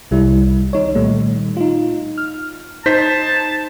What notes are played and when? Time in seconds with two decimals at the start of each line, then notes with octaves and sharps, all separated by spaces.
0.11 C2 G3 E4
0.73 D#3 D#4 C#5
0.95 A#2 D#3 G3 A3
1.57 D#4 F4
2.18 F6
2.86 D#4 C5 A5 B6